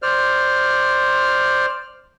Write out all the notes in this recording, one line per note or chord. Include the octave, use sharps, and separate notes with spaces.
C5 D5 F6